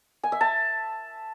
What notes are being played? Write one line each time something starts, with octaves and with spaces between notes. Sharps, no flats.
G#5
E5
A5